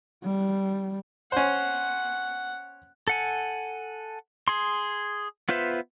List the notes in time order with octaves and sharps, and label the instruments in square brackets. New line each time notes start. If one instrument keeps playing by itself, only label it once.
[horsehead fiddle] G3
[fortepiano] C#4 C5 [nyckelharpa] F#5
[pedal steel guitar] A4 F#5 G#5
G#4 C6
B3 F4 B4 C5 E5